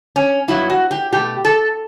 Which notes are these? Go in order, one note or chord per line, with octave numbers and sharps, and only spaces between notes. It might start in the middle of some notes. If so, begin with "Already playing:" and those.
C#4
G2 F#3 B3 E4
F#4
G4
B2 A3 G4
A4